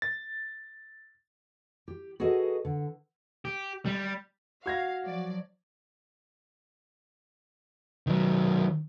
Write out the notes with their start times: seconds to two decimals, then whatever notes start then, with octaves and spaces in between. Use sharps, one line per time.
0.02 A6
1.88 G4
2.20 F#4 G#4 A4 B4 D#5
2.65 D3
3.45 G4
3.86 G3
4.66 F#4 F5 G#6 A#6
5.06 F3 F#3 D5
8.07 D#3 F#3